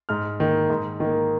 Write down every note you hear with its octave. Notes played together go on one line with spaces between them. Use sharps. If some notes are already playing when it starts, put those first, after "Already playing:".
G#2 F6
D#3 A#3
G#2
D#3 A#3